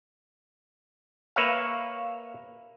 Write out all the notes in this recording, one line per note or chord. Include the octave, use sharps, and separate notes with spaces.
A#3 B4 C#5 E5 F5